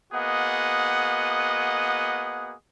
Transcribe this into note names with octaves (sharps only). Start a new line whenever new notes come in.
A#3 B3 F#4 G#4 D#5 F#5